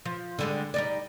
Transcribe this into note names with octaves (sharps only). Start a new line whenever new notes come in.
F3
D3 G3 G#3
G3 D#4 D5